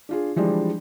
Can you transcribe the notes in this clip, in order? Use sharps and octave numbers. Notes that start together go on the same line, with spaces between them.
D4 F4 G#4
E3 F3 G3 G#3 D4